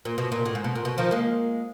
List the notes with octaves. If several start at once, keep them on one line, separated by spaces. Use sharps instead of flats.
A#2
B2
A#2
A2
G#2
B2
A#2
B2
D#3 F3
G#3 A#3